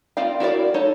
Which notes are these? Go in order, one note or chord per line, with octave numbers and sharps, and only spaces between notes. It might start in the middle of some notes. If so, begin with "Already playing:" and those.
C4 F4 D5 F5 G5
E4 F#4 A#4 D5
D#4 A4 C#5